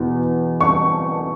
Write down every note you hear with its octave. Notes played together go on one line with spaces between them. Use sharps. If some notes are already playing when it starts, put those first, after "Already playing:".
Already playing: E2 B2
C#6